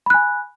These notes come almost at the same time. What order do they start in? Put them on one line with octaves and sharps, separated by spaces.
B5 F#6 G#5